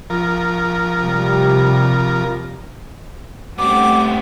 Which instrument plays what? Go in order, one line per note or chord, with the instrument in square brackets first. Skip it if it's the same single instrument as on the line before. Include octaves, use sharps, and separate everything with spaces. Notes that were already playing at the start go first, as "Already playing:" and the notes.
[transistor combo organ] F3 A#4
[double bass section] C3 G3
[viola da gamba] G3 A3 [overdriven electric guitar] B3 C4 [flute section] F#5 [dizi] D6